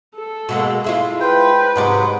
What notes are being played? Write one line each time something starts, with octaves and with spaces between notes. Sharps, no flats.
A4
B2 G#3 A#3
G#3 E4 F4
B4 C5 G5
G#2 C3 F#3 G#3 D5